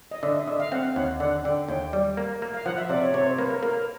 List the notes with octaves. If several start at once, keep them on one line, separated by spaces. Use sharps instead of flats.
D#5
D3 E5
D#5
D3 E5
F5
C4 F#5
D#2 F#5
D3 F#5
D3 G5
D#2 G5
G3
A#3
A#3
F5
F3 F#5
E5
C3 D5
C#5
C3 C#5
C5
A#3 B4
A#4
A#3 A#4